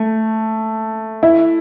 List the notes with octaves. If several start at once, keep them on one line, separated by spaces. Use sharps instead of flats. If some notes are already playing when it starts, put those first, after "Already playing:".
Already playing: A3
E4